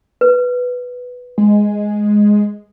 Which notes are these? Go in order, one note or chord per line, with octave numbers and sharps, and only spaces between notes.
B4
G#3